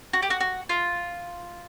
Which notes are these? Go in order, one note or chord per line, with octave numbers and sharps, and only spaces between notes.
F#4
G4
F#4
F#4
F4